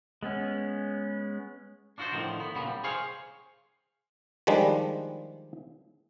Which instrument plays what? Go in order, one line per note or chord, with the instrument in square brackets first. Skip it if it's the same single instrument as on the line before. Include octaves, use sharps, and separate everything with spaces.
[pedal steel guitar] G#3 B3 C#4
[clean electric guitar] D4 F4 F#4 A4 C5
A2 D3 D#3 F3
B3
A#2 C#3 F3 F#3 B3
G3
G#4 C5 C#5 F5
[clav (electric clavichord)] D#3 F3 G3 G#3 D4